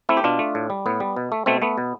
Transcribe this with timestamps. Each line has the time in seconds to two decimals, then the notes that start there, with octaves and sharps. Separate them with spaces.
0.09 A3 C4 E4
0.17 G4
0.24 B2 D4 F4
0.39 A3
0.55 A2
0.70 G3
0.86 A2 B3
1.00 G3
1.16 B2
1.32 A3
1.46 B2 A3 C4
1.62 A3 B3
1.78 B2